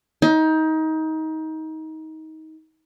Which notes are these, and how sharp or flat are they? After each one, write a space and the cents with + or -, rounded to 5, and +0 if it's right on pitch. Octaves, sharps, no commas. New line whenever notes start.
D#4 +25